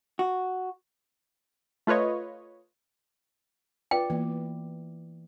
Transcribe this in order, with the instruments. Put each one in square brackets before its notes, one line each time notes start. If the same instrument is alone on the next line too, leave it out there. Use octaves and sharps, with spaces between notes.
[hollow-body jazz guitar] F#4
[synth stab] A3 F4 B4 C#5 D#5
[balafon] F4 B4 F5 [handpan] D5 [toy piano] G5
[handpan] E3 [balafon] A#3 B3 D5